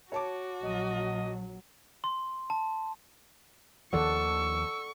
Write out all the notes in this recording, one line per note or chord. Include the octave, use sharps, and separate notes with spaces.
F#4 C#5 A5 D6
A#1 F#3 D#5
C6
A5
D#2 D#3 F3 A4 D5 F#5 C#6 E6